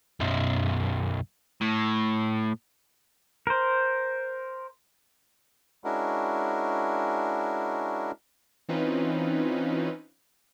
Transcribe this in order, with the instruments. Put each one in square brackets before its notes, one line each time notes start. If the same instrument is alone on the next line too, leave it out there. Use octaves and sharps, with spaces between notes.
[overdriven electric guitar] B1 F#2
A2
[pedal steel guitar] A#4 C5
[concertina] G#3 C#4 D4 E4 F#4 A#4
[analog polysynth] E3 C4 C#4 D#4 F4 B4